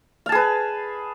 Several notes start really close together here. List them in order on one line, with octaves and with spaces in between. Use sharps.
F5 A5 G#4 B4